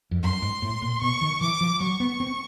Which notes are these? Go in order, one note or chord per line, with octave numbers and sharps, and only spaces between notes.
F2
F#2 C6
G#2
A2
A#2
B2 C#6
D#3
E3 D6
F3
F#3 C#6
B3
C4